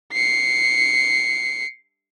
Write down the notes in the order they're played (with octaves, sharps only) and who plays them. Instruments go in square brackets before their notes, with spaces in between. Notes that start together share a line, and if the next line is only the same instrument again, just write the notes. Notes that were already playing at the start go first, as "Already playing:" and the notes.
[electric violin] C7 C#7